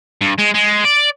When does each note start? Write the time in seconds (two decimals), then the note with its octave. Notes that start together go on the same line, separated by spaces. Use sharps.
0.22 G2
0.39 G#3
0.55 G#3
0.85 D5